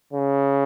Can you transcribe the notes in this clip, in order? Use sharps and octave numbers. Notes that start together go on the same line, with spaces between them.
C#3